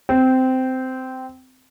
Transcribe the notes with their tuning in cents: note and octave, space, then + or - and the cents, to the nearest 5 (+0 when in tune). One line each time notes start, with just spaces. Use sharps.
C4 -15